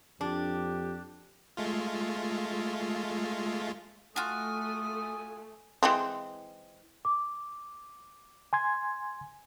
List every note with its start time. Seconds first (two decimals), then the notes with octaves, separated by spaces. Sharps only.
0.21 F2 D4 G4
1.57 G#3 A3 F4
4.16 A3 F4 F#4 G#5 D#6
5.83 E3 G#3 C4
7.05 D6
8.53 G#5 C6 G#6